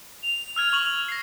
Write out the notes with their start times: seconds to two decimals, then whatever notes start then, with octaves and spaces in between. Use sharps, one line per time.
0.23 F7
0.56 E6 F6 G#6
0.73 C#6 F#7
1.09 A#6 C7